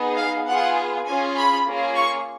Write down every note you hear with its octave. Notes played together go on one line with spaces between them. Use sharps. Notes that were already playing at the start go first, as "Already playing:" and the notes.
Already playing: B3 D#4 G#4
F5
B3 F4 G#4 F#5
C#4 F4 G#4 G#5
B5
A#3 C#4 F4 G#4
C#6